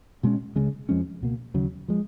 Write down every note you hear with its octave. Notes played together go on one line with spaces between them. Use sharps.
B2 G#3 C#4
C#2 C#3 G#3 C#4
F2 F3 G#3 C#4
C#2 B2 A#3
D#2 C#3 F#3
F3 G#3